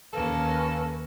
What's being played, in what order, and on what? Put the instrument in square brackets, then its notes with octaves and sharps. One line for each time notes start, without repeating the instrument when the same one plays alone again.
[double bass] D#2 [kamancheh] A#3 C#4 [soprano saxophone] A4 [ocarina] B4